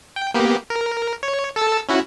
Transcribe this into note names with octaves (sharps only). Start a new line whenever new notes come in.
G5
A#3 B3 G4
A#4
C#5
A4 A5 E6
C#4 E4 F#4